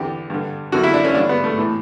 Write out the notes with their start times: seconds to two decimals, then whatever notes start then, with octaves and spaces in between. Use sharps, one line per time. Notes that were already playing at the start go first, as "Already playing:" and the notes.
Already playing: E2 D3 G4
0.30 G2 D3
0.72 F#2 D3 F#4
0.83 E4
0.94 D4
1.05 C#4
1.15 G2 D3 D4
1.29 B3
1.44 A3
1.58 A2 E3